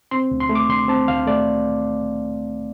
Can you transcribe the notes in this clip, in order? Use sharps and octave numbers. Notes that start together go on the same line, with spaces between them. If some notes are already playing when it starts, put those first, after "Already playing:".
C4 C6
D2
C6
A3
D6
D3 C6
C4 A5
D2 F5
A3 D5